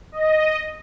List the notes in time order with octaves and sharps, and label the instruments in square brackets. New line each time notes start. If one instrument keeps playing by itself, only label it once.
[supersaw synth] D#5